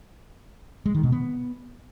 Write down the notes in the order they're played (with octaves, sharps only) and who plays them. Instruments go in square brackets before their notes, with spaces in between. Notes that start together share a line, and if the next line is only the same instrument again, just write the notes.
[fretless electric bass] G#3
D#3
B2
B3